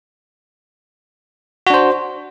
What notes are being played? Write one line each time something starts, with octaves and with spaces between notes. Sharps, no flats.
D4 F#4 C5